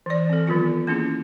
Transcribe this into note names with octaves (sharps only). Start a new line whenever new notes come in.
E3 D5
C4 A4
D#3 F#3 B3 F4
A#3 C#4 E4 G#4